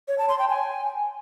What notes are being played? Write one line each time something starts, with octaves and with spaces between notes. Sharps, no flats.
C#5
A5
C6
G5
G#5